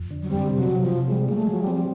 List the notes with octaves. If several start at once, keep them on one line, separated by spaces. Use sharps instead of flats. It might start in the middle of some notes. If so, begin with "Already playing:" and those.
Already playing: F2
D3
F#3
G3 C4
C3
F#3
C3
F3
C3
G3 G#3
G#3 A#3
A3
F3 F#3
G3
C4
G3